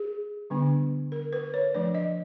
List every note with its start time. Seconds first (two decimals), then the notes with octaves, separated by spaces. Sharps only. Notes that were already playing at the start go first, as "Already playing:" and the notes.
Already playing: G#4
0.50 D3 G3 B3 D4
1.12 A#4
1.33 B4
1.54 C#5
1.74 F3 A3 D4 D5
1.95 D#5